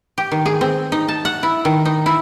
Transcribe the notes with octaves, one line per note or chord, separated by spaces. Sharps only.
G4
D#3
G#4
C4
D#4
A5
F#5
E4
D#3
D#4
E4